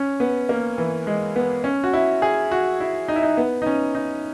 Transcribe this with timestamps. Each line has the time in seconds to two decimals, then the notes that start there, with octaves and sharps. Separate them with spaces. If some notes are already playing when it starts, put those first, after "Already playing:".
Already playing: C#4
0.20 B3
0.49 A#3
0.78 E3
1.07 G#3
1.36 B3
1.64 C#4
1.84 F#4
1.93 E4
2.22 G#4
2.52 F#4
2.80 E4
3.08 D#4
3.16 E4
3.23 D#4
3.37 B3
3.62 D#4
3.66 C#4
3.95 D#4